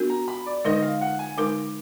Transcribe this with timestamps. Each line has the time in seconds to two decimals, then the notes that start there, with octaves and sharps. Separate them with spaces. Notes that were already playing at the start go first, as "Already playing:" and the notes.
Already playing: B3 D4 F#4 A#4
0.10 A#5
0.28 B5
0.46 D5
0.65 D3 G#3 D#4 A#4 D#5
0.82 F5
1.01 F#5
1.19 G#5
1.38 D3 G#3 D#4 A#4 D6